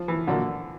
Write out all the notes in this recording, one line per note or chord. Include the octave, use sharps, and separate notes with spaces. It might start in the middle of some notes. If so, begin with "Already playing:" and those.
Already playing: F3
E3
A#2 D3 F#3 A#3 D4